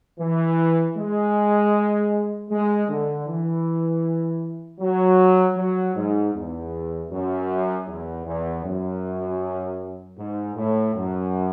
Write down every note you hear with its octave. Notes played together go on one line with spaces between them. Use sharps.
E3
G#3
G#3
D3
E3
F#3
F#3
G#2
E2
F#2
E2
E2
F#2
G#2
A2
F#2